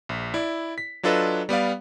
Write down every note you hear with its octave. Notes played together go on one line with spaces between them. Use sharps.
A#1
E4 D5
B6
F#3 D4 F4 A4 B4 D#5
G3 B3 D5 F5